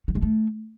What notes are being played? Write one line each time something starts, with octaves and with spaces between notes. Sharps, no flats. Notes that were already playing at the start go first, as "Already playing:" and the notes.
F#3
G#3
A3